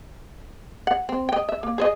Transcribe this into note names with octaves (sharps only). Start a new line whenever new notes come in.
F#5
C4
D#5 G5
E5
A#3
G#4 C5 D#5